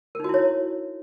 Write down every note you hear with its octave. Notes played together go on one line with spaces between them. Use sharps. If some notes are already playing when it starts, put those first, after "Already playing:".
D#4 E4 F#4 A#4 C#5